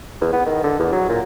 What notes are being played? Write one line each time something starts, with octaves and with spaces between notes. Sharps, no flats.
E2
B3
D#3
D3
E2
F#3
A#2